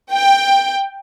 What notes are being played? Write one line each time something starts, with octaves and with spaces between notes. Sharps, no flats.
G5